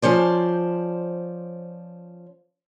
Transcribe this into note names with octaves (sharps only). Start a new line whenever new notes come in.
F3 C#4 C5 D5